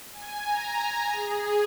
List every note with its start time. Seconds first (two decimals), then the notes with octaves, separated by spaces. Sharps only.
0.12 G#5
0.45 A#5
1.11 G#4